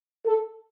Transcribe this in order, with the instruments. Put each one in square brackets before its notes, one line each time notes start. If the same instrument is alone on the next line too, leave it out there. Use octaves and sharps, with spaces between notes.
[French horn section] A4